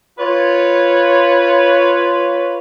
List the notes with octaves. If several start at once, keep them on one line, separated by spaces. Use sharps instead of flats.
F4 B4 C#5